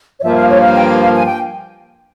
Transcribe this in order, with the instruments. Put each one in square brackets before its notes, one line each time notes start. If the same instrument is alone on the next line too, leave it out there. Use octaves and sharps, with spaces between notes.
[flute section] C#5
[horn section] G2 F3 A#3 [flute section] E5
[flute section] F5
C#5
F5
G5
F5
F5
G#5
G5